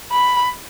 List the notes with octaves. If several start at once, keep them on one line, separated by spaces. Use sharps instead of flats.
B5